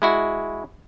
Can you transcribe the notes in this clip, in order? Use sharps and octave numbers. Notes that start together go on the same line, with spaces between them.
G#3 E4 F#4